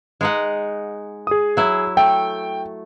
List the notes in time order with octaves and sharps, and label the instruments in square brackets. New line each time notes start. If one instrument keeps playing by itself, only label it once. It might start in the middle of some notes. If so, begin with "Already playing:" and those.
[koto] G#3 D#4 F#5
[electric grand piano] G#4 D#6
[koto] F#3 E4
[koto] A3 [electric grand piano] G5